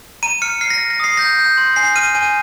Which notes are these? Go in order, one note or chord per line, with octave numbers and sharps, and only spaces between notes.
A#5 D#7
F6 C#7
F6 C7
A#6
F6
A#6
D#6 C7
G6 A#6
G6
C6
G#5 C7
F6 D#7
G#5 D#7